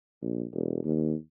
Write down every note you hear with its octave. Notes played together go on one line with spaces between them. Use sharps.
A#1
E1
D#2